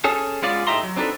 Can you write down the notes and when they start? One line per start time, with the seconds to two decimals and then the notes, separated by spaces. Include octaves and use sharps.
0.04 C#4 G#4 A4
0.42 G#3 B3 C#4 F4 D5
0.67 A2 D#4 G4 E5 A#5 C6
0.83 F#3
0.96 C4 D4 D#4 G#4 A4 B4